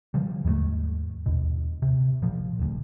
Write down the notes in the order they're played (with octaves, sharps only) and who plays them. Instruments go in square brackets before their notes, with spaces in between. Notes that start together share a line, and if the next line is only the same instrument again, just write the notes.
[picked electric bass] D3 F3 G3
D#2 G#2 G#3 A3
D#2 B2
C3
A#2 F3
D#1 D2